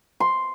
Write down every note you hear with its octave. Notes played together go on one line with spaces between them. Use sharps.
C6